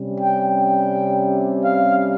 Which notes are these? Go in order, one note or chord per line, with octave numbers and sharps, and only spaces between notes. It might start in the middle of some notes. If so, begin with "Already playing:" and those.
Already playing: C3 G3 C#4
G5
G5
F5